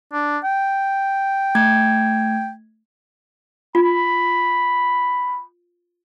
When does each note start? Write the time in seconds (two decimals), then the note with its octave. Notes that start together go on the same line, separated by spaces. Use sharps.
0.13 D4
0.44 G5
1.55 A3 G#6
3.75 F4 B5